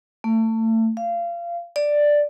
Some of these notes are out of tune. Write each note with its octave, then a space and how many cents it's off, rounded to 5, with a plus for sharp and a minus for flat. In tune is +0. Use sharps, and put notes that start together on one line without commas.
A3 +30
F5 -25
D5 +5